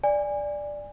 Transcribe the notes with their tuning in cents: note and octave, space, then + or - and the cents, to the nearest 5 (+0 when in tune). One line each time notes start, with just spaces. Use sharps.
D5 +0 G#5 -20